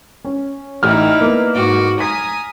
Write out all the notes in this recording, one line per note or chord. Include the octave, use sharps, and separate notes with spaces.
C#4
A1 D#4 E4 D5 F6
A#3 B3
G#2 F#4 D6
G#5 A#5 D#6 B6